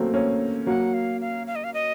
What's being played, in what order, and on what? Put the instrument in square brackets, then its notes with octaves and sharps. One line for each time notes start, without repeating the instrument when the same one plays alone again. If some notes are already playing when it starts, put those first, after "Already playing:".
Already playing: [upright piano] F#3 A3 A#3 C4 C#4
A#3 C#4
[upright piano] F#3 A#3 [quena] F#5
[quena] F5
F5
F5
D#5
F5
D#5